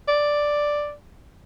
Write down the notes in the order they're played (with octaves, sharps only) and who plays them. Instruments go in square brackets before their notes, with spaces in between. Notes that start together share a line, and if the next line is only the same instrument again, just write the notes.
[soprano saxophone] D5